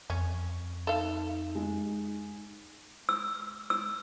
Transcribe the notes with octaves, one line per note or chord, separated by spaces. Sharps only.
F2 C#4
D#4 A4 F5
G#3
E6
E6